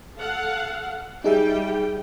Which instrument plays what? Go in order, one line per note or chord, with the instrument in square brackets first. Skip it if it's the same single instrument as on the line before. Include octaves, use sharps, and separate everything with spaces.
[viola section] A4 F5 F#5
[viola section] G3 G5 [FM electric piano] D#4 G#4 E5